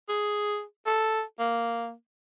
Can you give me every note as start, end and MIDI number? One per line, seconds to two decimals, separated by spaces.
0.09 0.63 68
0.86 1.23 69
1.39 1.93 58